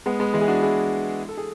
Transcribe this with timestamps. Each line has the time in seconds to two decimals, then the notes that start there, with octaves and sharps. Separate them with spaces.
0.06 G#3 B3
0.20 G#3 B3
0.34 E3 G#3
0.41 G#4
0.48 D4 F#4
0.62 E4 G#4
1.29 A4
1.37 G#4